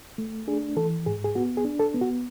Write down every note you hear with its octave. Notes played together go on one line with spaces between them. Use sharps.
A3
D4 G#4
E3 A4
G#2 G#4
G#4
B3 F#4
G#4
D4
A4
B3
F#4